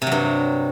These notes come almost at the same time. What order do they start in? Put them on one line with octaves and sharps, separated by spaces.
C3 F#3 G2